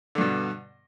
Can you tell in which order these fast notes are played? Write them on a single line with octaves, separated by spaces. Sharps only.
D3 G2 B2